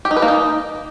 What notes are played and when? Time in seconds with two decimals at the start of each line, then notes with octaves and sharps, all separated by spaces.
0.05 G4
0.11 D#4
0.17 B4
0.22 A#3
0.28 D#4